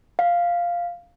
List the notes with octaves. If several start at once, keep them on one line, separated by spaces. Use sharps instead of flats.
F5